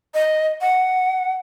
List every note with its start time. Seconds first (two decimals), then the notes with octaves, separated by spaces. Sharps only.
0.14 D#5
0.61 F#5